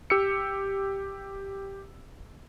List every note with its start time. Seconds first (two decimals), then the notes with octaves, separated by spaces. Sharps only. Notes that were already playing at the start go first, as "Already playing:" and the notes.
0.10 G4 E6 C#7